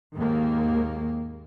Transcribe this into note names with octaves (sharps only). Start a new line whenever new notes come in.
D#2 G#2 D#3 A#3